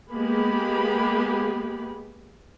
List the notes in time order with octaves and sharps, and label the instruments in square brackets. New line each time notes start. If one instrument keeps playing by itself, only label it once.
[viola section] G#3 A#3 B3 G4 G#4 B5